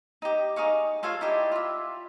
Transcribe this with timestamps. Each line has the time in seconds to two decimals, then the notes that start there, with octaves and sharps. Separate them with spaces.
0.22 D#4 G4
0.56 D#4 G#4 F5 C#6
1.03 F4 A4 C#5 F5
1.21 D#4 E4 G4 D5
1.52 F4 E5